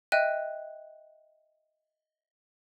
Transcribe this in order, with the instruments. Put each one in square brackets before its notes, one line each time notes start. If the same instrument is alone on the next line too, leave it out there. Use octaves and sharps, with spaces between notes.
[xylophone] D#5 E5 G5 F#6 D#7